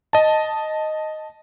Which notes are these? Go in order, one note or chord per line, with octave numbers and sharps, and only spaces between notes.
D#5 A5